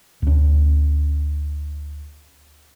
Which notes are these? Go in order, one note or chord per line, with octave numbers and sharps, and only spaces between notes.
D2 C#4